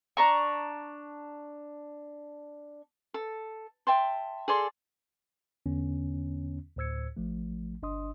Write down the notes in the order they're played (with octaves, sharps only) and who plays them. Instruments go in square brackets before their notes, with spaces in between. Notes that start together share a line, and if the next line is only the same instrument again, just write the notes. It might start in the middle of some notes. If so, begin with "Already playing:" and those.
[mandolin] D4 A#5 C#6
[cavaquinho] A4
E5 G5 A5 C6
G#4 A4 D5 C6
[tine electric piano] E2 D3 B3 C#4
D2 A2 C5 E6 G#6 C#7
A1 F3 A3
G1 D4 D#5 C6 D#6